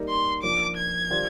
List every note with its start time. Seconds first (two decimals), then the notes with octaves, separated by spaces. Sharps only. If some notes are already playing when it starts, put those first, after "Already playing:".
Already playing: G3 A#3 D#4 A#4
0.09 C6
0.43 F3 A#3 D4 F4 D6
0.77 G#6
1.10 D#3 G3 D4 F4 C5